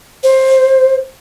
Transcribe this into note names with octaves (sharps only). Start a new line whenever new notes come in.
C5